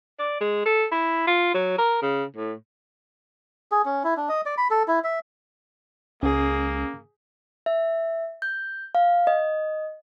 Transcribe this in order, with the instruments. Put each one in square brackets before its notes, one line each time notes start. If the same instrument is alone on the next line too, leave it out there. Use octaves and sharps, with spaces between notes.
[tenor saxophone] D5
G#3
A4
E4
F4
F#3
A#4
C#3
A2
[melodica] G#4
C#4
E4
D4
D#5
D5
B5
A4
E4
E5
[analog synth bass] C#2 [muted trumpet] A#3 [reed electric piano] C#4 [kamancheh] G#4
[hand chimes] E5
G6
F5
D#5